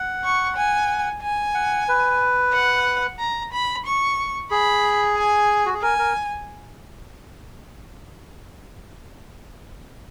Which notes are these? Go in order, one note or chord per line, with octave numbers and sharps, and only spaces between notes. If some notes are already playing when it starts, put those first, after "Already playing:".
Already playing: F#5
C#6
G#5
G#5
F#5
B4
F#5
A#5
B5
C#6
G#4 B5
G#5
F#4
G#4
A#4 G#5
A#4